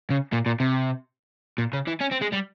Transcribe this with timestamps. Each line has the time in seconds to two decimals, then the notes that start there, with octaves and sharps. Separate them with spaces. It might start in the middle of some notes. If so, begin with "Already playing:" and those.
0.10 C#3
0.33 A#2
0.46 A#2
0.60 C3
1.58 A#2
1.73 C#3
1.87 E3
2.01 C#4
2.12 C4
2.22 G#3
2.33 G3